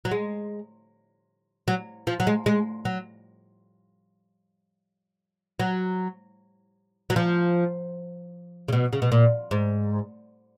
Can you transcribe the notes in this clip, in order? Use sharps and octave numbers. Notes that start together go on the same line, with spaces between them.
F#3
G#3
F#3
F3
F#3
G#3
G#3
F#3
F#3
F#3
F3
C#3
B2
C#3
B2
A#2
G#2